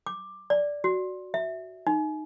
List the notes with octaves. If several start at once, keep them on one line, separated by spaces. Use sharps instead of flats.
D6
D5
F#4
E5
D#4